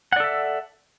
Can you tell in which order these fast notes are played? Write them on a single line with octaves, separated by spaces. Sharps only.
F#5 D5 A4 E5